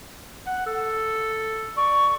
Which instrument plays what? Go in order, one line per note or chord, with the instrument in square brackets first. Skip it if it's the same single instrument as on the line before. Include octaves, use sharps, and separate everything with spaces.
[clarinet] F#5
A4
[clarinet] D5 [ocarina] C#6